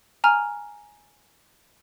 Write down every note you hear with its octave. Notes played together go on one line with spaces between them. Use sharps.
G#5 A#5 F6